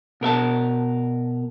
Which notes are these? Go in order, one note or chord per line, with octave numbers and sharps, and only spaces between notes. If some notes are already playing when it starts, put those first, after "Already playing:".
B2 A#4 E5 A5